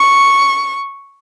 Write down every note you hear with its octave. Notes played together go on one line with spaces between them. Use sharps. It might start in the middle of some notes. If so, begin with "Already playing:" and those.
Already playing: C#6